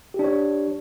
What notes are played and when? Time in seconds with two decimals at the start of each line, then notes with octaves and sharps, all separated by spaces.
0.14 G4
0.19 D4
0.24 C#5